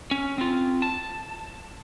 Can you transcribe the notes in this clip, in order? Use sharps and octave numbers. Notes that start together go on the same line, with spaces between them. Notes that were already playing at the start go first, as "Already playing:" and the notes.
C#4
C4 F4
A5